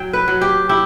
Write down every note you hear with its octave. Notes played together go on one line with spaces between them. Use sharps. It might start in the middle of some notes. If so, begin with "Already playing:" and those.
Already playing: F#3 G5
B4
F#3
G4
E4 G4